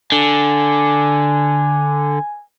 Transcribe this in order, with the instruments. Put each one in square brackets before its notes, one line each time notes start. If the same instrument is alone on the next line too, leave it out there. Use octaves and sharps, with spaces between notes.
[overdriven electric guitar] D3 [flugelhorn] G#5